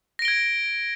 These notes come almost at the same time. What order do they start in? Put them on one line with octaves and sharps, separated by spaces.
A#6 D7 G7 G#6